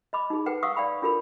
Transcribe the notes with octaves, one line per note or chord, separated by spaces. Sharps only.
D#5 B5 D6
D#4 G#4
A4 B4 F#5 G5
F5 F#5 C6 C#6 D#6 E6
D5 F5 G5 B5
D4 F4 A4 A#4 B5